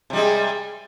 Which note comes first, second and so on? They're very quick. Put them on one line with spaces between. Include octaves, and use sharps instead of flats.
C3 G3 G#3